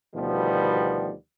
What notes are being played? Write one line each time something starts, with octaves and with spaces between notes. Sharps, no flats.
D2 B2 D#3 F3 G3 B3